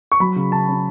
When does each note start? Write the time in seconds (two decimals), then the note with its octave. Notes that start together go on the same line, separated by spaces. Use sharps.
0.12 C#6
0.20 F#3 B5
0.36 C#3
0.52 C#3 A5
0.68 C#4